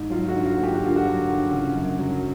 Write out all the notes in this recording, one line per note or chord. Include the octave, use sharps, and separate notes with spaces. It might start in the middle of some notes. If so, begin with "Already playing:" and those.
Already playing: G#2
F#3 F4
F#4
D3
F4
A#3
G4
F#4
D3 F4
F#4
F#3
D3
C#3
F#2
F#3